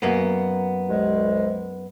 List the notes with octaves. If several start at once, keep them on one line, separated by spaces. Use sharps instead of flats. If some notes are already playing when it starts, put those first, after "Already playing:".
F#2 A#3 B3
C2 G#3